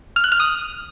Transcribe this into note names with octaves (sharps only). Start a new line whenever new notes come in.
F6
F#6
F6
D#6